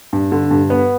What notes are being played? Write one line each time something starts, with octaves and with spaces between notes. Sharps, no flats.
G2
D3
G2
B3